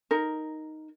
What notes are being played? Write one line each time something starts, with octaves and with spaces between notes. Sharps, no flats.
D#4 A#4